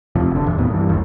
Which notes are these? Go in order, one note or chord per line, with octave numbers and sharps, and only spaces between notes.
F2 C3 F3
F#1 D3
D#1 E2
B1 A2 D#3 B3
G2 E3
F#1 D#2